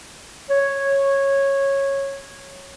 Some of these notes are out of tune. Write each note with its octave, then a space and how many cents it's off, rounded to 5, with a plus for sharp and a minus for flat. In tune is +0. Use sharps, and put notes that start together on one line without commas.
C#5 -10